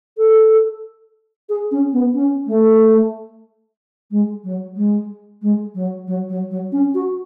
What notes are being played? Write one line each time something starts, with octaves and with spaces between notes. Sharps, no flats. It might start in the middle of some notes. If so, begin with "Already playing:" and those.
A4
G#4
C#4
B3
C#4
A3
G#3
F#3
G#3
G#3
F#3
F#3
F#3
F#3
C#4
F#4